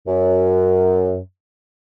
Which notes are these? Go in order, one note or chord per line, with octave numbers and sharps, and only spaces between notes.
F#2